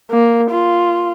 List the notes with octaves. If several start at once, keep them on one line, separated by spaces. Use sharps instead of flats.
A#3
F4